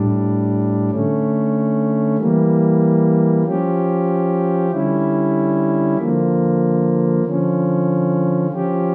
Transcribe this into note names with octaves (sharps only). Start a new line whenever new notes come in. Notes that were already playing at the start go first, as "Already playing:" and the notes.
Already playing: A2 G3 D4
D3 A3 C#4
E3 G3 A#3
F3 C#4 G4
D3 G3 C#4 E4
D3 F3 A#3
D3 F3 C#4
F3 C#4 G4